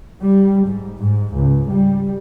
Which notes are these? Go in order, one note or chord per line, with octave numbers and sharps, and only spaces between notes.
G3
G#2
G#2
C#2
G3